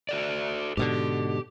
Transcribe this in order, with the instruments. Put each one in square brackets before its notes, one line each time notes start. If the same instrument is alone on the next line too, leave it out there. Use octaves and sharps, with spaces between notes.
[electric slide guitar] F#4 A4 D5
[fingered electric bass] G#2 B2 D3 [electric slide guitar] G4